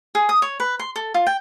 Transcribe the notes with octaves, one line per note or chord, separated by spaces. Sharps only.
G#4
D#6
C#5
B4
C6
A4
F4
G5